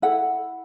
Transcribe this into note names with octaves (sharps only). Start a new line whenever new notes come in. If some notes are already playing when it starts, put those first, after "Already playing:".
E4 A4 F#5